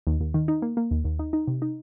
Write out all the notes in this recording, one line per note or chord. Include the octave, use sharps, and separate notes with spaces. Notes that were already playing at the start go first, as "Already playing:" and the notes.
D#2
D#2
D#3
D#4
A#3
A#3
D#2
D#2
D#4
D#4
C3
D#4